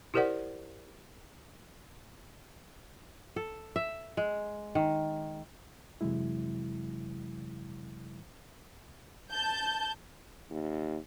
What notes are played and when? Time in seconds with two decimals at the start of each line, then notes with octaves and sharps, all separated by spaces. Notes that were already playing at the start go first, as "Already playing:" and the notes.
0.14 E4 G4 A#4 C5 D5 F#5
3.36 A4
3.76 E5
4.17 G#3
4.75 D#3
6.01 F2 C3 E3 F#3 G#3 E4
9.33 A5 G6
10.51 D#2